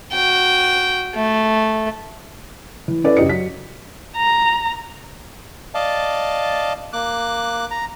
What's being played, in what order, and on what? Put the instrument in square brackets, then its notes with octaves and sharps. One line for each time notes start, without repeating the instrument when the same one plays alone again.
[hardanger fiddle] F#4 G5
A3
[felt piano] E3
C#4 E4 A4 B4 D5
F#2 C#3 G4 D#5 C#7
F#3 B6
[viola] A#5
[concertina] D5 D#5 F5 A5
A#3 D6 F#6
A#5